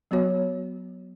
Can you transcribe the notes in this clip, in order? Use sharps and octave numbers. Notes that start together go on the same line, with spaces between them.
F#3 B3 F#4 C#5